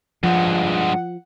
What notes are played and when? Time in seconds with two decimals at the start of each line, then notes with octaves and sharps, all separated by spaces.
0.23 G2 F3 G#3 F#5